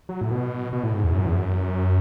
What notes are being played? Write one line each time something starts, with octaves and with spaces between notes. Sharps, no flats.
F#3
A2
B2
B2
A2
G#2
E2
F#2
E2
F#2